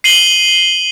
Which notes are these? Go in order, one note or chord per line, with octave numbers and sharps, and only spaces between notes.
C7 D#7 F#7 G7